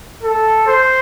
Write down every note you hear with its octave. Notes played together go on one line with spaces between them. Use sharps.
A4
C5